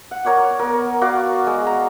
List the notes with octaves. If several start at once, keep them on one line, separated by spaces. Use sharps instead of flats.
F#5
A#4 C#5 D5 F#5
B3 A#4
F#4 D5 F5
G#3
A#5